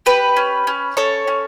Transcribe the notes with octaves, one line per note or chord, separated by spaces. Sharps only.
G4 B4
C#4
C#4
C#4 A4 C#5
C#4